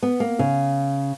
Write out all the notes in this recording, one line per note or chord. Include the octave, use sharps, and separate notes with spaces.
B3
A#3
C#3